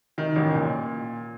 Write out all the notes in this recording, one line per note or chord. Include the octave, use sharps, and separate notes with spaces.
D#3
A1
A#2